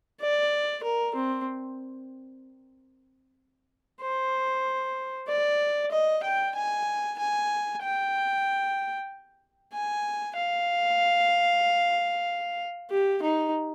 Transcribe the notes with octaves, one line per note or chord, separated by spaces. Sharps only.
D5
A#4
C4
C5
D5
D#5
G5
G#5
G#5
G5
G#5
F5
G4
D#4